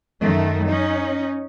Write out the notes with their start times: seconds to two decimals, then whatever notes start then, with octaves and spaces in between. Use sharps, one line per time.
0.20 F#2 D#3 A3
0.66 C#4 D#4